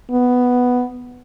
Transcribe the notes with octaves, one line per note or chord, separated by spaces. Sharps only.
B3